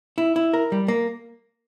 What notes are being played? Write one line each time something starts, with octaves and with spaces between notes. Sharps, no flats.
E4
E4
A#4
G3
A#3